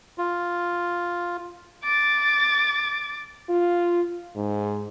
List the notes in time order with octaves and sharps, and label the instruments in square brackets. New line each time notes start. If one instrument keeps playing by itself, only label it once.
[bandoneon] F4
[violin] D6 A6
[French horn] F4
G#2